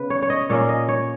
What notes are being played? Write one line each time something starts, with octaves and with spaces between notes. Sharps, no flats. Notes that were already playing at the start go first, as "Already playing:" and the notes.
Already playing: C#3 B3 B4
C#5
C#5
D#5
A#2 A#3 C#4 C#5
D#5
C#5